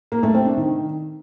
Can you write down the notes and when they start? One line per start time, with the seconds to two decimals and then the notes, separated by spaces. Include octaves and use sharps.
0.12 A#3
0.23 A3
0.34 C4
0.46 D4
0.57 D#3